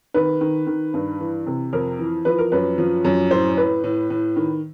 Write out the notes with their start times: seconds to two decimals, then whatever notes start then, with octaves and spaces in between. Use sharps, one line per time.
0.14 D#3 B4
0.41 D#3
0.67 D#3
0.94 G2
1.20 E3
1.47 C3
1.73 F2 A#4
1.99 E3
2.25 F3 B4
2.38 A#4
2.52 F#2 B4
2.78 F3
3.05 F#2
3.30 A2 C5
3.57 A2 B4
3.84 A2
4.10 A2
4.36 D#3